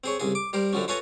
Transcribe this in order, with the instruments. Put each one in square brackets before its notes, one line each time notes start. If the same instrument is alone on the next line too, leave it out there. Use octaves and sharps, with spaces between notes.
[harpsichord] C4 G#4 C#5
C2 C#3 G#4
D6
G3 A#4 C5
F#2 D3 F3 F#3 C#4
F4 A4 B4 C#5 G#5 A#5